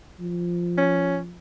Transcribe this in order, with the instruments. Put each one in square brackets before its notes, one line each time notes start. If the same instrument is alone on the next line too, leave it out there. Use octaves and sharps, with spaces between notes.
[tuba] F3
[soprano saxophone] C#4